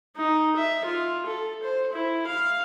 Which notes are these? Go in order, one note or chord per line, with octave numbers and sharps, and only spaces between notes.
D#4
E5
F4
A4
C5
E4
F5